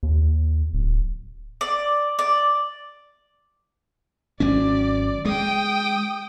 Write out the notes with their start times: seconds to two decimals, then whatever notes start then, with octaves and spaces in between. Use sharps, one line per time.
0.03 D#2
0.73 D1
1.61 D5
2.19 D5
4.40 G#1 F#3 C#4 D5
5.25 G#3 G5 D#6